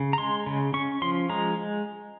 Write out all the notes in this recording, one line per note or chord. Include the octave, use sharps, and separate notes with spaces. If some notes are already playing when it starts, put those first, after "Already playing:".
Already playing: C#3
A#5
G#3 C6
C#3
C#4 C#6
F3 C6
G#3 A#5